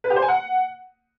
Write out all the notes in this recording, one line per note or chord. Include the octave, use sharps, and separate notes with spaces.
B4
G4
C5
G#5
F#5